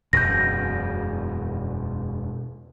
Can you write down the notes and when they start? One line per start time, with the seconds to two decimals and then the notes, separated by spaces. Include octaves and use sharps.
0.13 E1 F#2 B2 G6 A#6